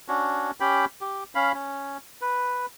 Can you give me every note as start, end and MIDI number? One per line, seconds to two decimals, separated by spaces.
0.08 0.51 61
0.08 0.51 62
0.08 0.51 66
0.60 0.85 61
0.60 0.85 67
0.60 0.85 79
0.60 0.85 83
1.01 1.24 67
1.35 1.52 61
1.35 1.52 77
1.35 1.52 83
1.54 1.97 61
2.21 2.66 71